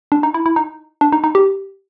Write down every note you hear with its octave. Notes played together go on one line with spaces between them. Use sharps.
D4
D#4
E4
E4
D#4
D4
D#4
D#4
G4